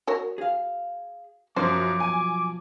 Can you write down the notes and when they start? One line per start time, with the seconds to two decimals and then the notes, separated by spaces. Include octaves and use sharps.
0.07 F#4 A#4 C#5
0.38 G#4 F5
1.56 B1 F#2 F3 F#3 C5 D6
2.00 G#5